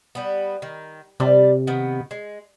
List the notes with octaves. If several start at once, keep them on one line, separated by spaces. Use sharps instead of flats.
G3 B3
D#3
C3 G3 D5
D#3 B3
G#3